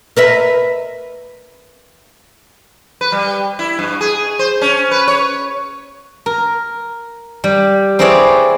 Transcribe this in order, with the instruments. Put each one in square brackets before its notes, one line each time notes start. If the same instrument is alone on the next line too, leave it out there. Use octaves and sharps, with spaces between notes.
[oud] A#4 B4 E5
[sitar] B4
G3
E4
G2
G#4
C5
C#4
B4
C#5
[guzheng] A#4
G3
C4 E4 G#4 B4 C#5 D5